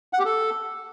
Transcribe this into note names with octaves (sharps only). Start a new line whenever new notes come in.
F#5
G4
A4